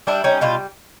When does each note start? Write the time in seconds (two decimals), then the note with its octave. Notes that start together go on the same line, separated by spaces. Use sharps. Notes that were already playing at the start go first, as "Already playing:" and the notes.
0.07 G3 D4 E4
0.24 G3 C#4 D#4
0.41 B2 D#4 F4